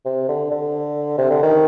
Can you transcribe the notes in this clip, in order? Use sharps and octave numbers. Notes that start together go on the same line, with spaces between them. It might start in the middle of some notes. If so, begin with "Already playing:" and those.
C3
D3
D3
C3
D3
D#3